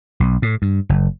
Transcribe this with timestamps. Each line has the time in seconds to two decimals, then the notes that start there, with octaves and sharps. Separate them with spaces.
0.20 B1
0.42 A2
0.62 G2
0.89 F#1